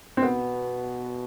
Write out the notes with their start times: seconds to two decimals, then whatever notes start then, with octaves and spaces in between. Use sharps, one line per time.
0.17 C4
0.22 B2 B3